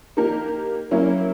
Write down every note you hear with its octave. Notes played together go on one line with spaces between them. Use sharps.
A#3 D#4 G4 A#4
F#3 A#3 C#4 E4